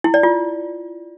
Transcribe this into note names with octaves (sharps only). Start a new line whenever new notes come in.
E4
D5
F4